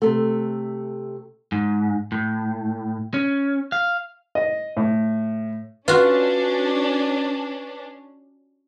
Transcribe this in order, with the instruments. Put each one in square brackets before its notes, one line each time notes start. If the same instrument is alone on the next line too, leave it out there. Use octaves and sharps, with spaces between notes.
[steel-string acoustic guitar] C3 A3
[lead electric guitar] G#2
A2
C#4
F5
[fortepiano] D#5
A2
[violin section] C#4 D4 [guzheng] F4 F#4 [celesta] B4